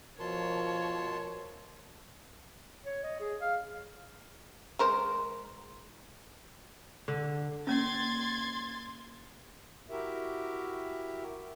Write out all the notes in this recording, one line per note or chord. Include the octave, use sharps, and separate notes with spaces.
B2 F3 A#4 C#5 A5 C6
C#5
D#5
G#4
F5
G#3 A#4 C5
D3
A#3 C#4 C6 G#6 A6
E4 F#4 G4 A#4 E5